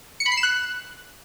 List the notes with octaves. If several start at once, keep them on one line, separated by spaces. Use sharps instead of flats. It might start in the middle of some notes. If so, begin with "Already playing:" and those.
C#7
B5
C7
E7
F#6